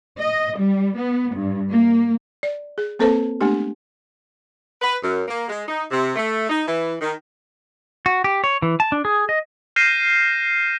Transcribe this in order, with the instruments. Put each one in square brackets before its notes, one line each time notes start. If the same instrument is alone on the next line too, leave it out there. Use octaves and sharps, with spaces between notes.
[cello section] D#5
G3
B3
G2
A#3
[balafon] D5
G#4
A#3 C4 A4 B4 C5 A5
G#3 A3 B3 D4 G4
[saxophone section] B4
F#2
A#3
G#3
D#4
C3
A3
D#4
E3
D#3
[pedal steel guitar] F#4
G4
C#5
E3
A5
D4
G#4
D#5
[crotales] F6 G6 A#6 C7 D#7 E7